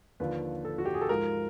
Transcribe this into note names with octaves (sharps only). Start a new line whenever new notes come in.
D#2 D3 F3 B4
A4
F#4
G4
G#4
A4
G#2 F3 A#4